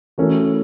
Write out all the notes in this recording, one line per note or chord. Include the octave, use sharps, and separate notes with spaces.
E3 A3 C#4 F#4 A#4